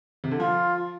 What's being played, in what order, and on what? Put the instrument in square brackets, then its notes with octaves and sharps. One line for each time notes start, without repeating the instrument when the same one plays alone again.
[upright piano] C3
D3
[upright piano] F3 [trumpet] F4